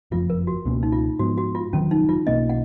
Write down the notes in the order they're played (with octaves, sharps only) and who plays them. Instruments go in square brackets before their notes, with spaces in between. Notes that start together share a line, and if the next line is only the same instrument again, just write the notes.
[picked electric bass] F#1 F2 F3 [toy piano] F4
[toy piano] A#4
F#4
[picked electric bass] C#2 B2 A#3 C#4
[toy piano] D#4
F4
[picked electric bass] G#2 F3 G#3 B3 [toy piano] F#4
[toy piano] F#4
F4
[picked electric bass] F1 F2 D#3 F#3 [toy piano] C#4
[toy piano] D#4
F4
[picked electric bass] B1 B2 A#3 C#4 [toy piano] D#5
[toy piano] F#5